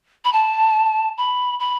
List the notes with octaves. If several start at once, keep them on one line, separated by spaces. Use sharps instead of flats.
B5
A5
B5
B5